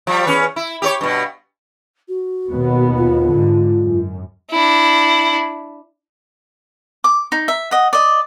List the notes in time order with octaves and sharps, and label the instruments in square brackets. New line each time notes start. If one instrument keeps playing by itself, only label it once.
[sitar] F3 G3
E2 C#4 B4
E4
G4 G#4 C#5
G2 B2
[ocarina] F#4
[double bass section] D#2 B2 B3
[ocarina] F4
[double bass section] G#2 D3
F#2
[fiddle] D4 E4
[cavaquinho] D6
D#4
E5
D#5 F#5
D5 D#5